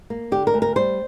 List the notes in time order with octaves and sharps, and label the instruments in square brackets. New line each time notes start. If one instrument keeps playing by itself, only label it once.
[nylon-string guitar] A#3
D3 G4
A#4
D2
A#4
G3 C5